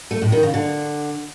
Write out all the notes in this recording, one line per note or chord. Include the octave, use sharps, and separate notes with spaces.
A3
A2
D#3
C#3
D3